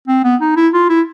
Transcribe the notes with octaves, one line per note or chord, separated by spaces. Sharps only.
C4
B3
D#4
E4
F4
E4